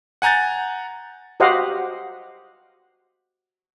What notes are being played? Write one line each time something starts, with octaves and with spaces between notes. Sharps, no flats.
F#5 G#5 A#5 G6 A6
F#4 G4 C5 D#5 F5 F#5